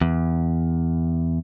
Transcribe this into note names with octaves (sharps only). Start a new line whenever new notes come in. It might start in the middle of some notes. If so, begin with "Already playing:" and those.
E2